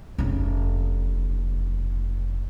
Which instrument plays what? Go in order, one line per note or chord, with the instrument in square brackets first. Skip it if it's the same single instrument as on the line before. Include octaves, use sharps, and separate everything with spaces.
[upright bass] F1 C#3